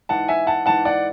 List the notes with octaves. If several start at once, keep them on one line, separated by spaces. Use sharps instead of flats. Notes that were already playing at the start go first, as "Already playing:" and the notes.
G#2 E3 F#5 A5
E5 G#5
F#5 A5
G#2 E3 F#5 A5
D5 F#5